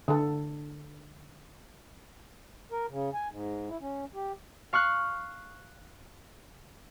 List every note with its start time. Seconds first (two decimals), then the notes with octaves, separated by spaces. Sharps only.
0.08 D3 A4
2.72 A#4
2.89 C#3
3.14 G#5
3.30 G#2
3.69 E4
3.81 C#4
4.14 G4
4.73 F5 C#6 F6 F#6